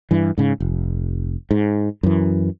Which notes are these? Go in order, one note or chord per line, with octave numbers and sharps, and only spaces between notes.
G2 E3
G#2 C#3
F1
G#2
F#2 E3